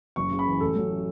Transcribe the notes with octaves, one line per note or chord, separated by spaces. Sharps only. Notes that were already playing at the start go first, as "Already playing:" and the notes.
F#1 C#6
C#3
B5
E3
A1 A4
F#3
A3